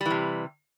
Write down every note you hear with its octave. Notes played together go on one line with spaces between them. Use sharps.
C3 E3 G3